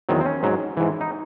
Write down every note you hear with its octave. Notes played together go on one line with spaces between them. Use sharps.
E2 D#3 F#3 C4
C4
C#4
G#2 F#3
G#2 E3
D#4